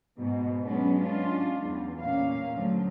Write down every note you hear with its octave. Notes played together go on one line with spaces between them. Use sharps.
G#2 B2
F#3 G#3 B3 C#4 D4
C#4 D4 F4
E2
A#2 A#3 C#4 F5
D2 F3 F#3